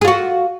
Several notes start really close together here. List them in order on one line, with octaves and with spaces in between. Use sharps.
G#4 F4 F#4